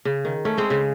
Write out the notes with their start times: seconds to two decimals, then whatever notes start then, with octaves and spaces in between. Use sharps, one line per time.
0.05 C#3
0.25 D#3
0.45 A3 C#4
0.57 G#3 C4
0.70 C#3